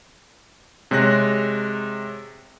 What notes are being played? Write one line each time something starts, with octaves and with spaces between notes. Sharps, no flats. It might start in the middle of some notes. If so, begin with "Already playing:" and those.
C3 G#3 C#5 F#6 A#6